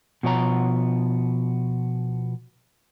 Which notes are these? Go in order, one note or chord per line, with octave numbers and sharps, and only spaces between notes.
B2 F3 B3 C#5 D5 A#5